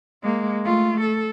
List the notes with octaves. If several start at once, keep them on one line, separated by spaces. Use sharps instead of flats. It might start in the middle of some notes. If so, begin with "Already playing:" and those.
G#3 A#3
A3 F4
A4